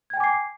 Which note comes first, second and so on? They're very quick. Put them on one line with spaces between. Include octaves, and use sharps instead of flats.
G#6 G5 G#5 D6 C7